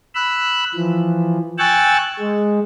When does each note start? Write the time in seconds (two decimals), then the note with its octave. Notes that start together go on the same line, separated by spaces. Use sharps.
0.15 B5 E6 F#6
0.74 E3 F3
1.58 G5 G#5 C#6 E6 F#6 A6
2.20 G#3